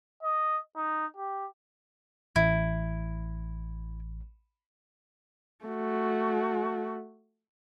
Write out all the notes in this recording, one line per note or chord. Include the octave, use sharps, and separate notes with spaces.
D#5
D#4
G4
A1 E4
A3 F#4